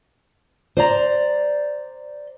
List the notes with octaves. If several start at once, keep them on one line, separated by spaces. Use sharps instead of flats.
C5 D5 A#5